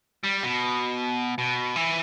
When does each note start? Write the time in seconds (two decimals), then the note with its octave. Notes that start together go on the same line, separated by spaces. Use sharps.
0.24 G3
0.43 B2
1.38 B2
1.76 E3